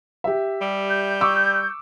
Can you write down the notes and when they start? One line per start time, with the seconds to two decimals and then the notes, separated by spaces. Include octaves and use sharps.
0.24 G4 E5
0.62 G3
0.89 G6
1.21 C#6 D6 E6